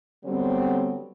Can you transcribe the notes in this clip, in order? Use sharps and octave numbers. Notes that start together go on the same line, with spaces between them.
D3 F#3 G3 B3 C4